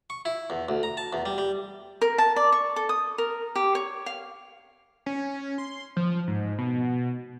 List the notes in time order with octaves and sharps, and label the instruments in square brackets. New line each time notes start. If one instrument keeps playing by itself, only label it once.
[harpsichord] C#6
E4
E2
D2
A#5
A5
E2
G3
G3
[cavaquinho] A#4
A5
D5
C#6
A4
D#6
A#4
G4
C#5
F5
[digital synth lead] C#4
C6
F3
G#2
B2